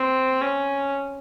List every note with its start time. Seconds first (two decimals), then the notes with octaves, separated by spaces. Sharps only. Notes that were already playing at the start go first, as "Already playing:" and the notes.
Already playing: C4
0.41 C#4